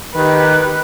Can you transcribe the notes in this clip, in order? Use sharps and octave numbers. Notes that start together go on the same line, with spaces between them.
D#3 G4 B4 F#6